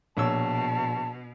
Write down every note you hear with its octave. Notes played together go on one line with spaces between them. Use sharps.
A#1 B2 C#5 A5 E6